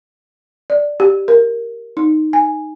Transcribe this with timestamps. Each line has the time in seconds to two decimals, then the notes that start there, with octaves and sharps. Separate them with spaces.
0.70 D5
1.00 G4
1.28 A#4
1.97 D#4
2.33 G#5